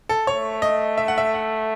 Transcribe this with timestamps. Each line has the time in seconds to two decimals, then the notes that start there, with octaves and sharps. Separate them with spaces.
0.09 A4
0.27 A3 C#5
0.62 D#5
0.97 E5
1.08 F#5
1.18 E5
1.34 F#5